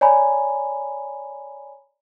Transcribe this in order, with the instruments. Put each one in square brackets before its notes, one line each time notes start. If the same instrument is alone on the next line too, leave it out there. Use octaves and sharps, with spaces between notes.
[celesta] C#5 D5 G#5 A#5 B5